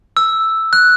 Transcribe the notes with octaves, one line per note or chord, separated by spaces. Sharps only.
E6
F#6